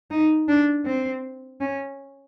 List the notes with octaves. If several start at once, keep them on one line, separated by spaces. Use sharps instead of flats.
D#4
D4
C4
C#4